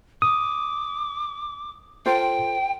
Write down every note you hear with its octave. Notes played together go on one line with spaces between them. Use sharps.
D6 D#6
F4 A4 C5 G5